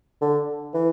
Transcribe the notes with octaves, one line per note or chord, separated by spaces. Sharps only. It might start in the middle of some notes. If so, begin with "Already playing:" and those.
D3
E3